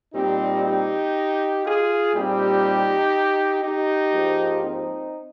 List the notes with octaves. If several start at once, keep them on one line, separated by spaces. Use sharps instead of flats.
A#2 G3 C4 D#4 G4
D#4 G4
F4 G#4
A#2 G3 C4 D#4 G4
D#4 G4
G#2 F3 A#3
C4 D#4